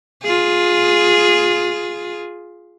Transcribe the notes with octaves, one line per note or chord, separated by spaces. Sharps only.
F4 G#4